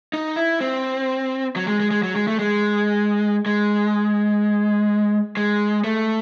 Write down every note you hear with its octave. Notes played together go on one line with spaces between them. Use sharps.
D#4
E4
C4
F#3
G#3
G#3
G#3
F#3
G#3
A3
G#3
G#3
G#3
A3